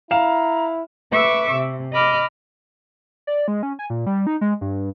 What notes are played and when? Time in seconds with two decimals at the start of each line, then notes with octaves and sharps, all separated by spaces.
0.11 E4 F5 A#5 E7
1.12 B4 E5 C#6 D6 E6
1.53 C3
1.93 D#5 B5 D6 F6
3.27 D5
3.48 G#3
3.63 C#4
3.79 G#5
3.90 A#2
4.06 G3
4.27 D#4
4.41 G#3
4.61 G2